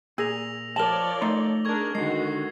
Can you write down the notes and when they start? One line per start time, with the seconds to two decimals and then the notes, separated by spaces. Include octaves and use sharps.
0.18 A#2 G#4 E6 A#6 F7
0.76 F3 A#4 C#5 D5 A5 F#7 G7
1.21 A3 D#4 A#5 C6
1.65 D4 G#4 A#4 C#6 G#6
1.95 D3 D#3 G#3 F#4 C7